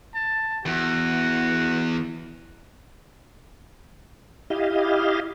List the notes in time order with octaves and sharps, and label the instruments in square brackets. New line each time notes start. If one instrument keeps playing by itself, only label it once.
[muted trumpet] A5
[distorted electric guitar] E2 [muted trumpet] F#4
[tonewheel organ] E4 G4 D#5 F5